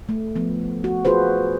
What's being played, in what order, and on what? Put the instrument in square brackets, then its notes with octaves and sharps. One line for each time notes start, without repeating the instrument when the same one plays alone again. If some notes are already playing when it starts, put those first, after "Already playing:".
[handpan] A3
F3 B3
F#4
F4 F#4 G#4 B4 C5